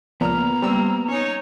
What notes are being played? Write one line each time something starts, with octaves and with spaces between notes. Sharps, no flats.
C#2 A#2 F3 B3 A#5 F6
G3 A#3 C4 E6
C#4 D#4 C#5